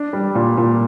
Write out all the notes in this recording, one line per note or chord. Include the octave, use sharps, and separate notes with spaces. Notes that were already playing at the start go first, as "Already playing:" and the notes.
Already playing: D4
G3
A#2
A#2